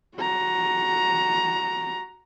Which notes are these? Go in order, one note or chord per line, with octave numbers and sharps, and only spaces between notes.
F#4 A#5